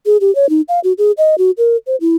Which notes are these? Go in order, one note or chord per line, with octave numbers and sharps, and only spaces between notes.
G#4
G4
C#5
D#4
F5
F#4
G#4
D#5
F#4
A#4
C5
E4